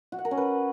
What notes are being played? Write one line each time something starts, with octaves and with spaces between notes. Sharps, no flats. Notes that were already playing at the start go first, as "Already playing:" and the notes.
F#4
F#5
A#4
C#4
B4